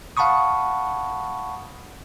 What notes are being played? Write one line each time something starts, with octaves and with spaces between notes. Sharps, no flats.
F5 F#5 A5 B5 C#6 D#6